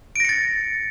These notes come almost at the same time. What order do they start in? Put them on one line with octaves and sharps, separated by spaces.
D7 A#6 C#7 A6